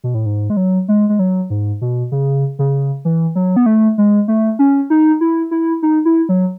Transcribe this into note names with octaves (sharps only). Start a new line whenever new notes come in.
B2
A2
G#2
G#3
F#3
G#3
G#3
F#3
G#2
B2
C#3
C#3
E3
F#3
B3
A3
G#3
A3
C#4
D#4
E4
E4
D#4
E4
F#3